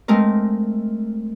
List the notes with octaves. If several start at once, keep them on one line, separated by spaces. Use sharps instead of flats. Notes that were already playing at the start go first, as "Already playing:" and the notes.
G#3 A3 C4 A#4